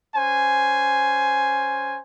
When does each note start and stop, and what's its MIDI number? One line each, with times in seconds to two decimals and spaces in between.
0.15 2.00 61
0.15 2.00 72
0.15 2.00 80